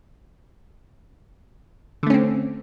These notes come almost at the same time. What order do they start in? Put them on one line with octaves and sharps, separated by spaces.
D3 A3 C#4 C4